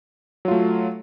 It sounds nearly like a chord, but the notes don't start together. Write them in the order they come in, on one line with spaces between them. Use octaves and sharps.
F#3 F4 A3